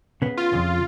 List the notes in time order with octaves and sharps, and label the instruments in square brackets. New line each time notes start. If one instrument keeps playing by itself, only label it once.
[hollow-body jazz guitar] C#3 B3
[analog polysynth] F4
[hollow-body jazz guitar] F2 C#3